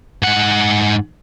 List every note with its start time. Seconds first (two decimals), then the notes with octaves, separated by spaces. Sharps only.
0.23 G#2 F#5